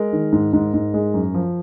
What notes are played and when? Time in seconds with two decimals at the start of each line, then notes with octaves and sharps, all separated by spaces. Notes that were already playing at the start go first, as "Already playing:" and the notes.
Already playing: G#3 A#4
0.13 D#3
0.32 G#2
0.53 G#2
0.74 G#2
0.94 G#3
1.14 F#2
1.34 F3